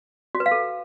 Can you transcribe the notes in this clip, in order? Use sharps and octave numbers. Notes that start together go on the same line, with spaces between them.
F#4
B4
F5
A4